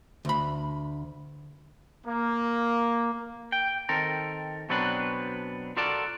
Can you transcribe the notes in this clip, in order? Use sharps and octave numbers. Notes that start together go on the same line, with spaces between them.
D2 B5
A#3
G5
D#3 C4 A4 A#4
B2 F#3 B3 C4 D4 B4
F4 F#4 A4 A#4 D5 A5